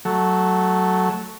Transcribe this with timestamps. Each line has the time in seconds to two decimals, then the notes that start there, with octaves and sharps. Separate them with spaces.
0.05 F#3 A3